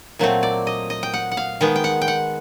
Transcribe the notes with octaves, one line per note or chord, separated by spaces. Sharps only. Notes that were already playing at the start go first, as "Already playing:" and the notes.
A#2 F#3 A3 C4
D5
D#5
D#5
G5
F#5
F#5
F5
D#3 G#3 B3 G5
G5
F#5
G5
F#5